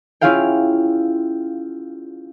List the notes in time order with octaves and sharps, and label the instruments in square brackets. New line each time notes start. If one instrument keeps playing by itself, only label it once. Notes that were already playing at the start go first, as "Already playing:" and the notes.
[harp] C#4 E4 F4 G#4 F5 G5